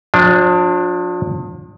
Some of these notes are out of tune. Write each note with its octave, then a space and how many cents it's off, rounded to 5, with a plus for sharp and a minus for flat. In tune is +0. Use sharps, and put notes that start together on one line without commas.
F3 +40 D4 +0